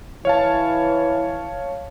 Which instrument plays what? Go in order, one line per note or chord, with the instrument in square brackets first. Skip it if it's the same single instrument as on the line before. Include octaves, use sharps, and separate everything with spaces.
[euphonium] E3 [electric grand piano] C#5 F5 A5